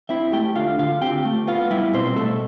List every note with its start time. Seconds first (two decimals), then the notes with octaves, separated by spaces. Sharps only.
0.09 C4 E4 E5
0.32 A3 G4 G5
0.55 D3 F4 F5
0.79 D3 F4 F5
1.02 C4 G4 G5
1.25 A3
1.47 B3 F4 F5
1.70 G3 E4 E5
1.93 B2 C4 C5
2.16 B2 A3 A4